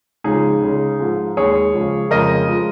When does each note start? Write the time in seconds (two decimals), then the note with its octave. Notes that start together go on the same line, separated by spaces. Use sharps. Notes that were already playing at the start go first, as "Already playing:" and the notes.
0.24 C#2 C#3 F3 G#3 D#4 G#4
0.62 C#2 C#3 G#3
0.99 G#2 F3 G#3
1.37 D#2 D#3 G#3 G#4 C#5
1.74 C#2 C#3 F3
2.11 F2 C#3 G#3 A#4 D#5
2.48 F3 G#3